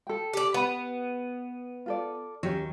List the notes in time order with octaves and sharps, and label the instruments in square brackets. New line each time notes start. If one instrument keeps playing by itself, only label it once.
[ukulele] A4 G5
[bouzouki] G4 D5
[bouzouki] B3 [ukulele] F#5 B5
[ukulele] F4 A4 D5
[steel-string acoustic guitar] D#2 F#3 [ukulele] C#4 G4 C#5